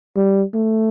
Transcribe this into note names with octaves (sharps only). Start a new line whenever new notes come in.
G3
A3